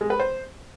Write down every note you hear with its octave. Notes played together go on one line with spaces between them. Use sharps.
G#3
B4
C5